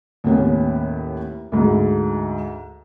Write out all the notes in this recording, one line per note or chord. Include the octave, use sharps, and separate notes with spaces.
D#2 A2 B3 C#4
D2 G#2